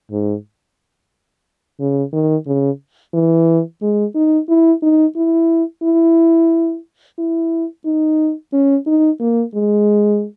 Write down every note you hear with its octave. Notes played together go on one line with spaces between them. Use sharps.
G#2
C#3
D#3
C#3
E3
G#3
D#4
E4
D#4
E4
E4
E4
D#4
C#4
D#4
A#3
G#3